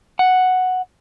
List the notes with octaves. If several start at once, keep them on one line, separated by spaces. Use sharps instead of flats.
F#5